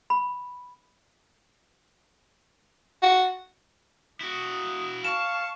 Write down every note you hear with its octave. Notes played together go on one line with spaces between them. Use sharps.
B5
F#4
E4 F#4 D#6
F5 A5 C#6 E7